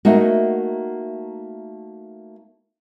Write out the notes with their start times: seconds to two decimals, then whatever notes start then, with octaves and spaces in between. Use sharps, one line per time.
0.05 A3 A#3 D#4 F#4